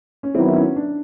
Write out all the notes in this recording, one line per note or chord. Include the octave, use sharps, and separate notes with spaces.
C#4
D#3 F#3 B3 C4 E4
C#4
D4